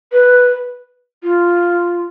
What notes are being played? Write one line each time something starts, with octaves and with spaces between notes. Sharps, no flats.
B4
F4